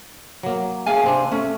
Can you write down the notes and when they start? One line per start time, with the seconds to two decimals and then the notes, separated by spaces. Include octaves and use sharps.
0.43 F#3 A#3
0.86 G#4 F5 G#5
1.04 C3 C4 D4
1.32 A3 C#4